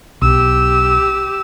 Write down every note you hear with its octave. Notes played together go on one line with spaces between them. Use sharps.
B1 G4 E6